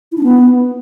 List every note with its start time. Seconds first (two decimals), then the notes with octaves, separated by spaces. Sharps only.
0.12 E4
0.18 D4
0.23 B3